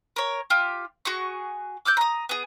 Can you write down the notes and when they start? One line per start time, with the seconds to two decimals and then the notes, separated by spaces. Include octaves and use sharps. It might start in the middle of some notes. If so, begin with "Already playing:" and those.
0.16 A#4 C#5
0.50 F4 G4
1.05 F#4 G#4 C#6
1.85 D6 E6 F#6 G6
1.97 A#5 D#6
2.29 B3 G#4